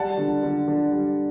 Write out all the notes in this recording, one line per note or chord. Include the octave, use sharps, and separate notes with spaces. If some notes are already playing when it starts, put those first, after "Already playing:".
Already playing: G3 F#5 A5
D3
D3
D3
G3